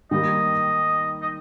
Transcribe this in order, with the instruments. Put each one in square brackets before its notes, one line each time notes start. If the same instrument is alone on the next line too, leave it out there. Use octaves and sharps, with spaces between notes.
[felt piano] D#3 G3 A#3 D#4 [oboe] D#5
[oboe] D#5